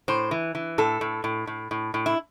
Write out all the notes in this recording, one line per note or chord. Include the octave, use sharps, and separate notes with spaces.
A2 C5
E3
E3
A2 A4
A2
A2
A2
A2
A2
E4